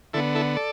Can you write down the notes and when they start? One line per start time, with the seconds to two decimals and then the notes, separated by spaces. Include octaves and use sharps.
0.13 D3 B3 E4 A4
0.35 E4 A4
0.56 A4 D5